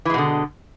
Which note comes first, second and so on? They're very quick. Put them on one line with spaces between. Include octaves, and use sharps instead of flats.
E3 G#3 B2 D3